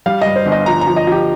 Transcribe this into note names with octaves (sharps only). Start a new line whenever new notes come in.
G3 F5
G2 D#5
C5
G1
D#5
F3 A#5
A#5
F3
D#5
F3 G4